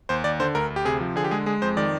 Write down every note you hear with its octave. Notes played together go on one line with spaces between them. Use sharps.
D#2 C5
D#2 D5
D3 C5
D2 A#4
D2
G4
C3 G#4
F3
D3 G#4
G4
G#3 G#4
G#3 G#4
F2 C5
D#3 D5